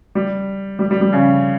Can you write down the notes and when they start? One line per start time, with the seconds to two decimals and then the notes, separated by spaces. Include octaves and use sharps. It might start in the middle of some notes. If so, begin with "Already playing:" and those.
0.15 G3
0.79 G3
0.91 G3
1.01 G3
1.13 C#3